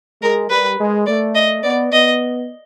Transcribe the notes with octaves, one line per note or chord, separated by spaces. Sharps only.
G#3 A#4
G3 B4
G#3
A3 D5
D#5
B3 D5
B3 D#5